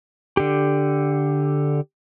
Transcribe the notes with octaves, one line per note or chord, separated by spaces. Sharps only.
D3 G4